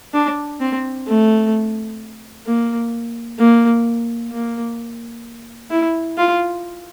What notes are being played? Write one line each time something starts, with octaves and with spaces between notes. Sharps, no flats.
D4
C4
A3
A#3
A#3
A#3
E4
F4